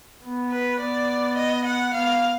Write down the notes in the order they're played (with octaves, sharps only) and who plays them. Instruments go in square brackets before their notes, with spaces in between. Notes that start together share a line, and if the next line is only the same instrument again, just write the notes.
[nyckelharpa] B3
[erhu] B4
[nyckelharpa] B3 [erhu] D5
[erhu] D#5
F#5
[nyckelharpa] B3 [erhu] F5